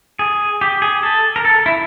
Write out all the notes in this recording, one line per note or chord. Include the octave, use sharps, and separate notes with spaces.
G#4
G4
G#4
A4
A#4
A4
E4